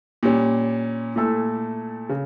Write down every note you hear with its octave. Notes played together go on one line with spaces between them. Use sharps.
A#2 G3 C#4
A#2 A3 E4 A4
C#3